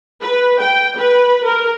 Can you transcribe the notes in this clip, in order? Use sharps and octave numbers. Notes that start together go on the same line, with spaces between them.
B4
G5
B4
A#4